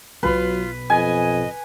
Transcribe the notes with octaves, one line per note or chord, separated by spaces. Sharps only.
B1 B2 F#3 F4 B4
F2 D#5 G#5